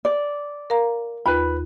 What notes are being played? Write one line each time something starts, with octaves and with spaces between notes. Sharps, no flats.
D5
A#4 F5 A#5
D#2 F4 B4 B5